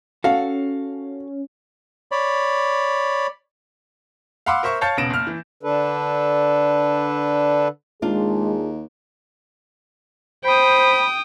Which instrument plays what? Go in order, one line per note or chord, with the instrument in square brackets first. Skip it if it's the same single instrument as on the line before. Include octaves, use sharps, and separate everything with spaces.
[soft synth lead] C#4 [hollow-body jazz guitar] F#4 A4 [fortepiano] F5
[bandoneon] C#5 D5 B5
[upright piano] F5 F#5 B5 C6 D6 E6
A#4 C5 E5 C#6
C#5 F5 A5 G6 A6 C#7
E1 C#3 B3 A#6 D7 E7
F#1 F6
E3
[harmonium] D3 D4 A4 B4
[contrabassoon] D#2 [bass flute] G#3 [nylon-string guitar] D4 F4 [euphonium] G#4
[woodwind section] C5 B5 [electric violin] G5 D#6